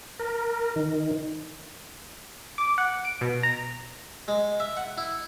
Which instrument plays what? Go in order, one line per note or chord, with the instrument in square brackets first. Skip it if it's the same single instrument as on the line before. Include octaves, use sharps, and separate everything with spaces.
[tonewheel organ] A#4
D#3
[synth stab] D6
F#5
D7
B2
A#5
[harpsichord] G#3
E5
F#5
E4